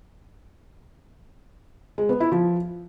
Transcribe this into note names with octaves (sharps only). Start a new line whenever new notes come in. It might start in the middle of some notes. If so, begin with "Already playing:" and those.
G#3
B3
E4
F3